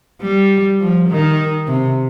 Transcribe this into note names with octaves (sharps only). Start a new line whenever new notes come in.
G3
F3
D#3
C3